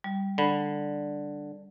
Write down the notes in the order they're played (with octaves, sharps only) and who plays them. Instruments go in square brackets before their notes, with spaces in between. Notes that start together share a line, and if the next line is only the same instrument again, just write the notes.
[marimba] G3
[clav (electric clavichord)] D3 [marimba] B5